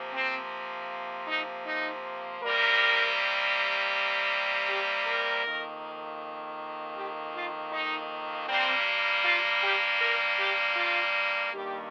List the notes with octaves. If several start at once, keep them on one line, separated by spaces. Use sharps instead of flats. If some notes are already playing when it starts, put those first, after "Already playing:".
Already playing: C3 F3 A#3
C4
D#4
D#4
C3 G3 A#3 A#4
G4
A#4
F2 D#3 A#3
G4
F4
D#4
G2 G3 A#3 C4
F4
G4
A#4
G4
F4
G2 D#3 G3 A#3 G4